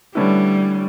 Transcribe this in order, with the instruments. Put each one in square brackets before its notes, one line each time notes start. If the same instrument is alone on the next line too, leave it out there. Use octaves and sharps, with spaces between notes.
[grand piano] D3 A3 C#4 E4 B4 [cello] G3